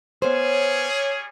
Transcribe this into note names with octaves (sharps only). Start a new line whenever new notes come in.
G3 B3 C#4 G#4 C5 C#5